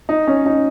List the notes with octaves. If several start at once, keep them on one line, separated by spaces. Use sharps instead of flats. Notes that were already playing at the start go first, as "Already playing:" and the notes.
D#4
C#4
D#4